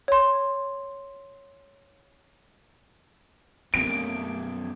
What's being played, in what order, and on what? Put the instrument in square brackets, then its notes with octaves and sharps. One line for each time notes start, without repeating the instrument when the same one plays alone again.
[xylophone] C#5 C6
[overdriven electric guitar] F#2 B2 [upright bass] F3 C4 [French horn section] A3 A#3 [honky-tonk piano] D7